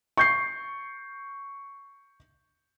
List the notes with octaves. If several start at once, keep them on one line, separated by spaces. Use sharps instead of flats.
C#6 G6 C7